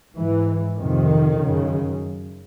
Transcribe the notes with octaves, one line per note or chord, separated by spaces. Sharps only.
G#2 E3
F2 C3 D#3
F#2 C#3